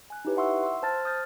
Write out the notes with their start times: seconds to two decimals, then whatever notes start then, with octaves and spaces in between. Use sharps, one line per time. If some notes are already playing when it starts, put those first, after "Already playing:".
0.10 G#5 F#6
0.25 D#4 E4 G4 B4 C#5
0.37 E5 F#5 C6 C#6 E6
0.63 C6 E6
0.83 C5 A5 F6 A6
1.05 D#6 F6 G6 A6